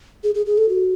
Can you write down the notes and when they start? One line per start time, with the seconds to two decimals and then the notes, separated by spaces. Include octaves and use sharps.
0.24 G#4
0.35 G#4
0.46 G#4
0.58 A4
0.69 F#4